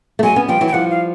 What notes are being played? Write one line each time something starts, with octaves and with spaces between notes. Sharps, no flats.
A3
F#3 G#3 G#5
B3 C#4
F3 G3 G5
E3 F#3
G5
F3 G3 F#5
F5